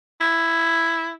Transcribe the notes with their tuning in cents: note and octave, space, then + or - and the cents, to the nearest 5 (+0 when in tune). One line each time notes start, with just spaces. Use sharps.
E4 +5